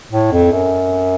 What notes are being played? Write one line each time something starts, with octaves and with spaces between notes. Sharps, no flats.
A2
F2
F#2